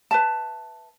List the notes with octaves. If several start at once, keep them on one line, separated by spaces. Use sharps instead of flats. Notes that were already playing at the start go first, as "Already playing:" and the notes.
B4 E5 A5